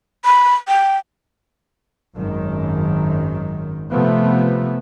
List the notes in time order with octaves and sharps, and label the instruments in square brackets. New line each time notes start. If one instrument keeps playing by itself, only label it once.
[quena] B5
G5
[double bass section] G#1 F#2 D#3
C3 F3 A3 B3